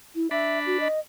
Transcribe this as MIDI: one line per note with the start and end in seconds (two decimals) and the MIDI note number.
0.16 0.30 64
0.31 0.88 62
0.31 0.59 76
0.31 0.88 83
0.66 0.77 66
0.80 0.99 75